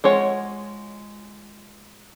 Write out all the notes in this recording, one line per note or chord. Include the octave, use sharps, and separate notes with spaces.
G#3 F4 C#5 F#5